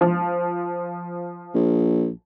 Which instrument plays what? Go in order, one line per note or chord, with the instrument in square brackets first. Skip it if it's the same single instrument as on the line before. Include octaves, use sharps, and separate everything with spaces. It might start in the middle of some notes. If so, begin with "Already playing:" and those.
[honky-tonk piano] F3
[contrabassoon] A#1